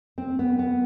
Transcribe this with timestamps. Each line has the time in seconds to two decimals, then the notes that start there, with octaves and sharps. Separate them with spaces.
0.18 C4
0.39 B3
0.59 B3